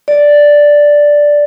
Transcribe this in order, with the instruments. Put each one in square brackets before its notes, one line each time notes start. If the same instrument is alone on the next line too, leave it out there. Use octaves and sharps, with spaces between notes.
[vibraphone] D5